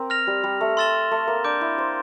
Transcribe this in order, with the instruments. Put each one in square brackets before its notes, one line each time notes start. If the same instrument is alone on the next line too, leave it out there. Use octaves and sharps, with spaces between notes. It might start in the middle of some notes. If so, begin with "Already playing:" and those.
Already playing: [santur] C4 A#4
[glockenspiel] F6 A#6 F7
[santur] G3
G3
A3
[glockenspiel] C6 E6 A6 E7 G7
[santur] A3
A#3
[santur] D4 [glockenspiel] D6 G6 D7
[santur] E4
C5